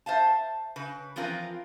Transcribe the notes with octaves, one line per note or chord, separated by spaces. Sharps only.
C5 E5 F5 A5
C#3 B4
E3 F3 C4 F4 A#4 B4